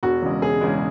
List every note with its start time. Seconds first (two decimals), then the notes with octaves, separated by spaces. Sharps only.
0.03 E1 F#4
0.22 E2 C#3 G#3
0.42 E1 G#4
0.61 E2 C#3 G#3